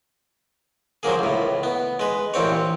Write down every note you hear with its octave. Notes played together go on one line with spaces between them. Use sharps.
F3 F#3 A#3 G#4
C#2 A2
B3
G#3 B4
A1 A#2 C4 C#5